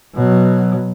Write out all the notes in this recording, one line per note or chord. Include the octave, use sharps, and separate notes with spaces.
B2 F#3